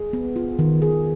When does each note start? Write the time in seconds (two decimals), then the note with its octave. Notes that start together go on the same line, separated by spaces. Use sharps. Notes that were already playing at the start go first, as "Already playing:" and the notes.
Already playing: G#4
0.13 B3
0.36 F4
0.59 D#3
0.82 G#4